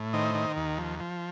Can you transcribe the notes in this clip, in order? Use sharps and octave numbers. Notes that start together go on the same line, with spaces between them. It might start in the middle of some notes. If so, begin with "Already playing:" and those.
Already playing: A2
D#3 C5 D#5
D#3
D#2
F3
F3